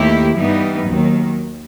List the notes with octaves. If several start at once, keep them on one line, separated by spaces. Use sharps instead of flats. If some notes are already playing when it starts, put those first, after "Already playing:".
Already playing: D#2 D#3 A3 E4 G4
G2 E3 G3 B3 D#4
D#2 D#3 F#3